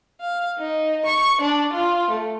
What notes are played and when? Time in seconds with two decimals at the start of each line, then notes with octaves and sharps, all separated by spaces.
0.21 F5
0.59 D#4
1.04 C#6
1.41 D4
1.74 F4
2.09 A3